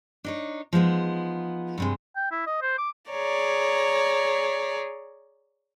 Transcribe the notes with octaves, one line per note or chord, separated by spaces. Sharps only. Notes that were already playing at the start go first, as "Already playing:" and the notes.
D4 D#4 C#5
F3 G#3 B3 D#4
G2 C3 G#3
G5
E4
D#5
C5
D6
G#4 C#5 D5 A#5